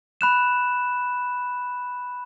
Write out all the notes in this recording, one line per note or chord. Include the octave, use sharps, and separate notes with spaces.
B5 F#6 E7